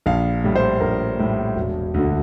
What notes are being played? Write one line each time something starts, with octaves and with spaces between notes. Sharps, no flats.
A#1 F5
A2 G3
C5
A#1 A#4
A2 G3
E1
D2 D3